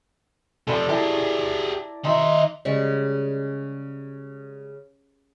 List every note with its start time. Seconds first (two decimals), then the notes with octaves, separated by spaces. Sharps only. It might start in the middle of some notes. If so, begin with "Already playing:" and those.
0.67 C3 F3 A4 D5 B5
0.89 E4 G4 G#4 A5 A#5
2.05 D#3 D#4 E5 C6
2.65 C#3 G3 G#3 C#6